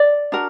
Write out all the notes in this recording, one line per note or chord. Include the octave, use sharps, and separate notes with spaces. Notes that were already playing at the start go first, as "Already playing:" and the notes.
Already playing: D5
D4 F#4 A#4